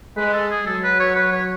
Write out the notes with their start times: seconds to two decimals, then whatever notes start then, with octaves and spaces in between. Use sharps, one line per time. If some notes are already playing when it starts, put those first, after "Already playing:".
0.17 G#3 B4
0.33 A4
0.50 G#4
0.66 F#3 A4
0.83 B4
1.00 C#5
1.16 B4
1.32 C#5